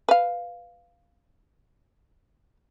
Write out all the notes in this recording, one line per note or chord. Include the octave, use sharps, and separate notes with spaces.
B4 F5